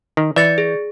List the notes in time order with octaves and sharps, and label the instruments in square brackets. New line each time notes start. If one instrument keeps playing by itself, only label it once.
[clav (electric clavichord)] D#3
[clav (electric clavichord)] E3 [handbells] D5 A6 C#7
[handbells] G#4